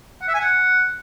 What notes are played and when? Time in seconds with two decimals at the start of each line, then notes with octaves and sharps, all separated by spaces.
0.22 F#5
0.28 E5
0.34 G#5
0.40 F#5